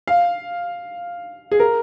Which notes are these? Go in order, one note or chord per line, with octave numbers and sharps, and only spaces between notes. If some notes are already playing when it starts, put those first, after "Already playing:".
F5
G#4
A#4